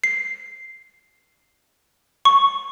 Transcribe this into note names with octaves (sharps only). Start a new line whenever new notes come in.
C7
C#6